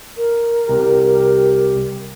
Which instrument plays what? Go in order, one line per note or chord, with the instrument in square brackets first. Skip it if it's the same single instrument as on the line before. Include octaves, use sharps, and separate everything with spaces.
[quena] A#4
[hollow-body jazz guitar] C2 [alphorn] G4